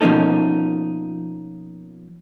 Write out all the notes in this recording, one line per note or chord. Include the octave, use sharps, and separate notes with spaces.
B2 F3 A#3 C#4 D#4 A4